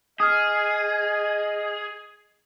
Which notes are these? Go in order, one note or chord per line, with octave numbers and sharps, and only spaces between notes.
G#4 D#5 D#6 F6